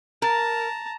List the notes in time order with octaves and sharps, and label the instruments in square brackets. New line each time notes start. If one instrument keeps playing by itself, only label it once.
[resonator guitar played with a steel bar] A#4 [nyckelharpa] A5 A#5